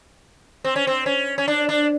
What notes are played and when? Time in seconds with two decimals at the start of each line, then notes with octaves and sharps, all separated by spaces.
0.64 C4
0.76 C#4
0.87 C4
1.06 C#4
1.38 C#4
1.48 D4
1.69 D4